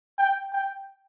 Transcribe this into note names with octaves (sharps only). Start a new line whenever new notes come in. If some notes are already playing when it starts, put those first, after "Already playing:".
G5
G5